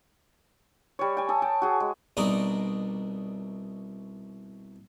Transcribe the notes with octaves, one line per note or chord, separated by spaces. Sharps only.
G3 C#5
G5 G#5
A4 D#6
G5 A5
F#4 G#4
G#3
C2 B2 D4 D#4 A#4